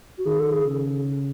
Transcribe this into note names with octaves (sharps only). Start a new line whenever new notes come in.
F#4
D#3 G#4
A4
G#4
C#3